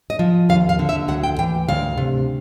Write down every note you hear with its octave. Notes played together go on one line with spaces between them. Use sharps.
D#5
F3
D#2 F5
F5
D3
E5
D2 F#5
G5
E3 G5
D2 F5
C3